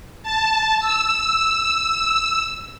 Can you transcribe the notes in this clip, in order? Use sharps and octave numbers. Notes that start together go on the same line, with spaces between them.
A5
E6